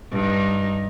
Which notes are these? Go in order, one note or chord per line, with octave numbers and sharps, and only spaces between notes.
G2 D#4